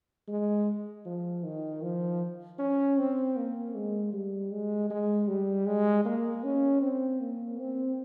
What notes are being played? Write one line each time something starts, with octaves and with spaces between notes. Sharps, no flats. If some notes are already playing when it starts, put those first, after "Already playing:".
G#3
F3
D#3
F3
C#4
C4
A#3
G#3
G3
G#3
G#3
G3
G#3
A#3
C#4
C4
A#3
C4